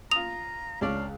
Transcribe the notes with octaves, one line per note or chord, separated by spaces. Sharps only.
F4 A#5 D#6 F7
C#2 C#4 D4 D5 F5